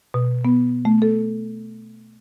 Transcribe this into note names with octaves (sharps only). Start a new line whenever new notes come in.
B2
B3
A3
A4